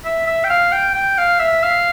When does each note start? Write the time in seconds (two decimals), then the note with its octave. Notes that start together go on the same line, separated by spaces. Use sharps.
0.05 E5
0.27 E5
0.44 G5
0.50 F5
0.72 G5
0.94 G5
1.18 F5
1.39 E5
1.63 F5